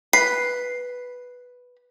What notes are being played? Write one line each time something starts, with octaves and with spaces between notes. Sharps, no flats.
B4 C7